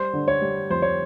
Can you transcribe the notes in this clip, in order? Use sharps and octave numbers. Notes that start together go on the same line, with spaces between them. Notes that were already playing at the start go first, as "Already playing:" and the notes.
Already playing: G3 C5
D3
C#5
G3
F2 C5
C#5